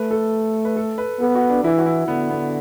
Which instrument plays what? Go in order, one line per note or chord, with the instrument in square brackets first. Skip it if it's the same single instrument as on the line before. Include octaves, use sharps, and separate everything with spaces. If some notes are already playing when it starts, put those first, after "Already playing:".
Already playing: [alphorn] A3 [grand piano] B4
[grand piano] A4
B4
A4
B4
[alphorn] B3 [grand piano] A4
[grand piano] F#4
D4
[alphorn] E3 [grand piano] E4
[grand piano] F#4
E4
[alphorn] D3 [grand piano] B3
[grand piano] B3